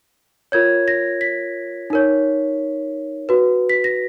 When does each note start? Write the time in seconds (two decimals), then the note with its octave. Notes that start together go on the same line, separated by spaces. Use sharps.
0.52 F4 A#4 C#5 G#6
0.88 A#6
1.21 B6
1.90 D#4 A#4 C#5
3.29 F#4 B4
3.69 B6
3.84 A#6